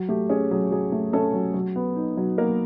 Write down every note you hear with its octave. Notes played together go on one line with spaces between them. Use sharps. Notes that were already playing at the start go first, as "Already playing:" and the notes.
Already playing: F#3
A3 G4
C#4 G#4
F#3 G#4
F#3 G#4
A3
A3 C#4 A4
F#3
F#3
B3
D#4
F#3
F#3 A#3 A#4